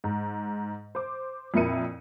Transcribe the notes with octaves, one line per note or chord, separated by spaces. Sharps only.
G#2
C5 D6
F2 A#2 E4 A#4 C#7 D#7